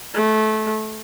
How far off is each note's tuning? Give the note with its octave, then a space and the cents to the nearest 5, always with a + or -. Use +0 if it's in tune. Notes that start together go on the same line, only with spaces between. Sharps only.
A3 -20